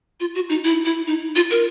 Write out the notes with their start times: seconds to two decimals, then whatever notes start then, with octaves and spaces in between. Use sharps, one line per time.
0.20 F4
0.35 F#4
0.49 D#4
0.64 E4
0.85 E4
1.07 D#4
1.36 F4
1.51 A#4